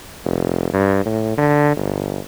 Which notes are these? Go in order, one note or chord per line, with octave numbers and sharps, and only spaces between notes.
F1
G2
A2
D3
G1